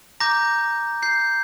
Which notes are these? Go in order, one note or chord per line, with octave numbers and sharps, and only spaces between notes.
A#5 D6 G6 A#6
G6 C7